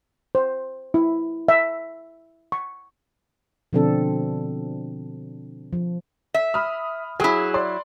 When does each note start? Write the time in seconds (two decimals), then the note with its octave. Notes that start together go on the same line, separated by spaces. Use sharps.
0.35 C5
0.94 E4
1.48 E5
2.52 C#6
3.73 B2 D3 F3 C4 D4 A4
5.73 F3
6.34 E5
6.54 B5 D#6 F6
7.20 F#3 E4 G#4
7.54 D5 C6